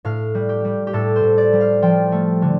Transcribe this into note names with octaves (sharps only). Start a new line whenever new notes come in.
A2 F5
G3
G4
G3
G4
A2 A4
C5
A2
D5
G3
F5
F3 G5
A3
D3